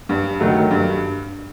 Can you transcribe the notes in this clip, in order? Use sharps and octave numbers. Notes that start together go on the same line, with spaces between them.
G2
D#3 F#3 A3
G2